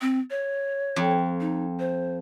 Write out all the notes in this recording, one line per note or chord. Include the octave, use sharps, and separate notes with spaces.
C4
C#5
F2
D#4
C5